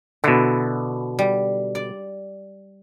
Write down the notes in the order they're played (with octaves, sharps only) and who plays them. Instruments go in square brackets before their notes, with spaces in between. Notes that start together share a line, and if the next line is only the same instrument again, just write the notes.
[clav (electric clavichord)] B2 D3 [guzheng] E4
[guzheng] G3
D5